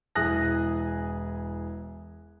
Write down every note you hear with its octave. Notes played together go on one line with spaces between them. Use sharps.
E1 E4 G#4 D#6 F#6 A#6